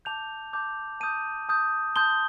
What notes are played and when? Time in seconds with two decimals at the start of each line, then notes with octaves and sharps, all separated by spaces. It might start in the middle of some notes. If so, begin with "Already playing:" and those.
0.05 A5 D6 G6 F7
0.53 A5 D6 G6
1.00 A5 D#6 G6 D#7
1.49 A5 D#6 G6
1.96 A5 C6 D#6 G6 G7